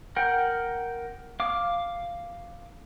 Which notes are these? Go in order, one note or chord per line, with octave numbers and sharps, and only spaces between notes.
A#4 F#5 G5
F5 D6